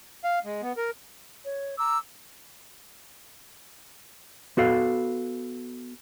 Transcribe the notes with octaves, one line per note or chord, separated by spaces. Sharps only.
F5
G#3
B3
A#4
C#5
A#5 D6 E6
B3 F#4 A4 F5